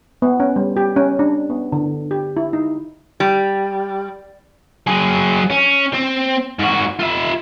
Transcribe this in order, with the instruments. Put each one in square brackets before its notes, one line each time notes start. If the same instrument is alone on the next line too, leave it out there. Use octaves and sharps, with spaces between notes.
[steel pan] B3
C#4
G3
G4
C#4
D4
B3
D3
G4
E4
D#4
[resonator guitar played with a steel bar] G3
[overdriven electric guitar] F#3 G#4
C#4
C4
G#2 F#4
F4 E5